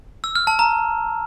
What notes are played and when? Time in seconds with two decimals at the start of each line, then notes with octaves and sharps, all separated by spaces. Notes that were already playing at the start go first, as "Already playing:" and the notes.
0.24 E6
0.35 F6
0.47 A5
0.59 A#5